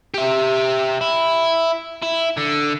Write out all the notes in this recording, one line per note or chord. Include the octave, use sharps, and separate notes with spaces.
G4 E5
E4
E4
D3